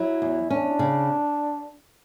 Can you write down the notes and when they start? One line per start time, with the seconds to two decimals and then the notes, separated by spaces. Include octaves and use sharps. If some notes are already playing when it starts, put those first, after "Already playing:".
Already playing: F#3 E4
0.22 E2
0.50 C#4 D4
0.79 C#3